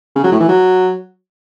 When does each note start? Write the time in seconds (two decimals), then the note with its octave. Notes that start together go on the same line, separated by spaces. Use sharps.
0.15 C#3
0.24 F#3
0.32 A2
0.40 E3
0.48 F#3